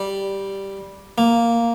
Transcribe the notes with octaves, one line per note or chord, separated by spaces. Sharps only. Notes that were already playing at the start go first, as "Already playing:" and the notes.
Already playing: G3
A#3